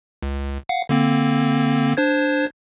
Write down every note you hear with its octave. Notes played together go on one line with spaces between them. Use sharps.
C#2
F5 F#5
D3 A#3 C4
D4 C5 G#6